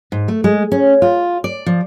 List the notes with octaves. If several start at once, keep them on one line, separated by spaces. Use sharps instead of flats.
G#2
A3
G#3
C#4
F4
D5
F3